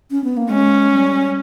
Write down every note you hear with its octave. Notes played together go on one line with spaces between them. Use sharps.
C#4
B3
A#3
G#3 C#4
G3